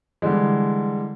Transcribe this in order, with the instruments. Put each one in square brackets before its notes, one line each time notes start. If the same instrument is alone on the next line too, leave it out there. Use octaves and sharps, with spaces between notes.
[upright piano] D3 E3 G3 G#3